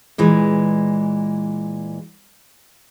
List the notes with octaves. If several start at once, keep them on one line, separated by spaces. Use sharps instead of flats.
A#2 E3 G#3